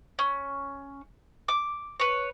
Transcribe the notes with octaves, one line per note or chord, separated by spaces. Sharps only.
C#4
D6
B4 C#5